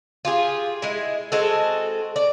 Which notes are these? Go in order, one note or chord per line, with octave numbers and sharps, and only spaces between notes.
F4 G4 G#4
G#3 E4
G#3 C4 F#4 A4
D5